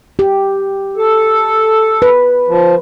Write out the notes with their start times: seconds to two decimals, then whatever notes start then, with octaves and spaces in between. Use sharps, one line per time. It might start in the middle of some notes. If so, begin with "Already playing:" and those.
0.19 G4
0.97 A4
2.02 B4
2.48 F3